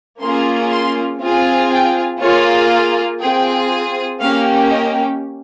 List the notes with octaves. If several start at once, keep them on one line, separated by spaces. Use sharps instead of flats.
A#3 C#4 F4 G#4 C6
C6
C4 F4 G#4
G5
A#3 F4 G#4 C#5
F5
C4 F4 G#4 G5
A#3 C#4 G4 F5
D#5